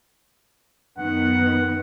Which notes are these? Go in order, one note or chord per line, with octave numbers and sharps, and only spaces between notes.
F#2 D#3 B3 F#5